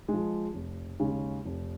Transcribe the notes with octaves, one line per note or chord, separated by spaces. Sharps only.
F3 G#3
F1
D#2 C#3 G#3 C#4
F1